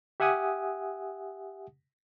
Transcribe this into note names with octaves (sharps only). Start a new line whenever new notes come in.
G4 E5 F#5 G#5 D#6